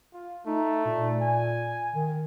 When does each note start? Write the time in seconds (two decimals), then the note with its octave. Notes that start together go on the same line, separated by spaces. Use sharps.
0.13 F4
0.46 A3 D#4
0.85 A#2
1.22 G#5
1.94 D#3